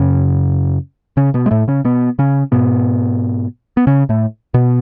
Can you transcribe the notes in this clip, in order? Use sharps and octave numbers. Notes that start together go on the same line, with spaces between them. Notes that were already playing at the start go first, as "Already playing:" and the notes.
Already playing: F#2 C#3 C#4
C#3 C#4
B2 B3
G#3
A2 A3
C#3 C#4
B2 B3
C#3 C#4
G#2 B2 B3
B3
C#3 C#4
A2 A3
B2 B3